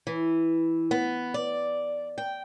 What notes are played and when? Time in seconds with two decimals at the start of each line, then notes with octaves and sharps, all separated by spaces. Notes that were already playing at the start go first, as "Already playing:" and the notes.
0.07 E3
0.91 B3
1.34 D5
2.18 G5